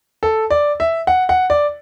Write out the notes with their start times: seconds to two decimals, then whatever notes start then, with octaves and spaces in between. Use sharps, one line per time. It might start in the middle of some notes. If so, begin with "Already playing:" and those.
0.23 A4
0.50 D5
0.80 E5
1.07 F#5
1.29 F#5
1.50 D5